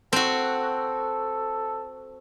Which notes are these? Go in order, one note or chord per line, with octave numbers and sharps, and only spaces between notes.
C4 F#4 A4